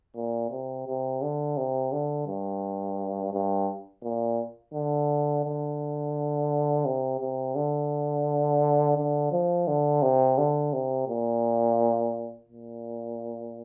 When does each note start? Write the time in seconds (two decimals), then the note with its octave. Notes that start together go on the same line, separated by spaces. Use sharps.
0.16 A#2
0.51 C3
0.87 C3
1.22 D3
1.57 C3
1.92 D3
2.27 G2
3.33 G2
4.03 A#2
4.74 D3
5.45 D3
6.85 C3
7.20 C3
7.56 D3
8.97 D3
9.32 F3
9.67 D3
10.02 C3
10.38 D3
10.73 C3
11.08 A#2
12.49 A#2